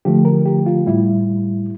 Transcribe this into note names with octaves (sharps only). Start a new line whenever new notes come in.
D3 F3 A3 G4
A#4
G4
F4
A2 G3 E4